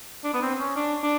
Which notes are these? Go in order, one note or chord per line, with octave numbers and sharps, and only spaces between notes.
D4
B3
C4
C#4
D4
D4